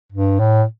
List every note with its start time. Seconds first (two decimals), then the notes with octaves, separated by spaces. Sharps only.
0.12 G2
0.39 A2